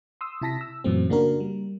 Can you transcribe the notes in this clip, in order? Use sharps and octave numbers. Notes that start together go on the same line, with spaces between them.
C6 D#6 E6
C3 E4 A5 A#6 B6
E6
F#2 A#2 E3 F#3 A3 C4
C#3 A#3 D4 F#4 A#4
G3